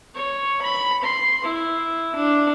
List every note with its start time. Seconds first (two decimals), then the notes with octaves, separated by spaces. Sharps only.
0.15 C#5
0.62 B5
1.03 C6
1.44 E4
2.15 D4